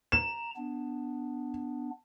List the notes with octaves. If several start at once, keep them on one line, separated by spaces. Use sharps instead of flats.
A#5 E7
B3 D4